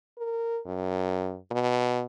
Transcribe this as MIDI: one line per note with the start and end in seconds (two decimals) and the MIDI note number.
0.18 0.60 70
0.66 1.37 42
1.51 2.04 47